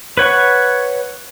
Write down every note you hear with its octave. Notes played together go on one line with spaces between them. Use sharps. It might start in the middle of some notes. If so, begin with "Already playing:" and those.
B4 C#5 F#5 C#6